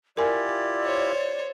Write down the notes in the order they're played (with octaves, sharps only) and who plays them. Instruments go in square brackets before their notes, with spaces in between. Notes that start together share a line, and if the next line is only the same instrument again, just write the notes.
[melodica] E4 F4 G4 [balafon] A#4 G#5 [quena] D5
[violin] C5 C#5